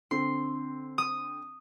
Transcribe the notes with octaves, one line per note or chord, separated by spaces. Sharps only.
D3 C4 C6
D#6